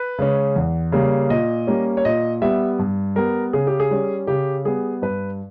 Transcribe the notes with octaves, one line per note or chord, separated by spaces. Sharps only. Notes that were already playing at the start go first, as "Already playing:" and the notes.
Already playing: B4
C#3 G#3 C#4
E2
C#3 G3 A#3 C#4
A#2 D#5
G3 A#3 C#4
C#5
A#2 D#5
G3 B3 E5
G2
G3 B3 A#4
C#3 G#4
G4
G#4
G3 C#4
C#3 G4
G3 B3 G#4
G2 B4